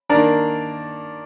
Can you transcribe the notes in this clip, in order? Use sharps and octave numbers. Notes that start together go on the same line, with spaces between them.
D#3 A#3 D4 A#4 D5